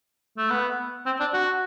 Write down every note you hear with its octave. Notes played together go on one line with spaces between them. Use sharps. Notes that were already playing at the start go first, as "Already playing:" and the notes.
A3
B3
C4
D4
F#4